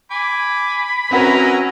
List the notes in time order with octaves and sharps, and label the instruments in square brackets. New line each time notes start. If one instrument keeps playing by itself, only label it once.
[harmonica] G#5 D6 [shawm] B5
[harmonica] F#3 D#4 E4 [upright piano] C4 F#4 B4 [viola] C#4 A#5